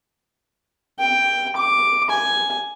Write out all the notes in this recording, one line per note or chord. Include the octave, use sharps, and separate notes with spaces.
G5
D6
G#5